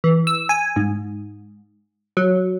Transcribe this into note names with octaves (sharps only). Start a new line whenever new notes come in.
E3
E6
G#5
G#2
F#3